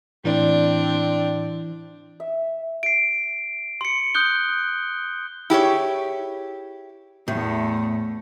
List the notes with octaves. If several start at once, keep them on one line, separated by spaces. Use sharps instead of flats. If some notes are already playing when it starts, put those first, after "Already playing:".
A2 E3 C4 D4 E4 D5
E5
C7 D7
C6 C#7
D#6 F#6 G6 G7
E4 G4 G#4 C#5
E2 A2 A3